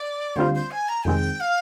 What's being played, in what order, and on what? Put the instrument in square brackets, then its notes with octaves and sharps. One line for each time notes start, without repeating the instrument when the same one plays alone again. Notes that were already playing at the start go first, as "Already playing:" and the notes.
Already playing: [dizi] D5
[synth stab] D2 D3 G3 C4 F4 [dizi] C5
[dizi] C5
G#5
A#5
[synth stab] F2 C3 D#3 G#3 C4 [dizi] G5
[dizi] F5